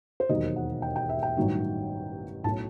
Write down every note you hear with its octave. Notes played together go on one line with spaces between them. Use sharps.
C5
E1 D#2 D#3 F#3 D#5
F#5
G5
G5
E5
G5
A1 G2 D#3 F#3
B1 A2 F#3 A5